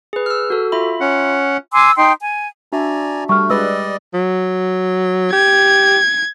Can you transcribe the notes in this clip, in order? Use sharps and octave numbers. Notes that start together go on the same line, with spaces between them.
G#4 B4
E6 F6
F#4 A4
F4 E5 B5
C#4 F#5
G#5 C6 D6 E6
D#4 G5 C6
G#5
D4 F#4 D5 E5 G#5 A#5
G3 A3 C#6 F6
G3 G#3 B4 D5 D#5 E6
F#3
G4 G#6